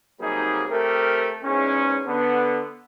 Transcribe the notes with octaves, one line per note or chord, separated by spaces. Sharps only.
C3 F#3 G3 A#3 D#4 G#4
A3 C4 G4 A#4
E2 G#2 C#4
D3 B3